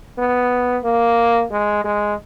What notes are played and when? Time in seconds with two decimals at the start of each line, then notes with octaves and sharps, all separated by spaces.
0.18 B3
0.84 A#3
1.51 G#3
1.84 G#3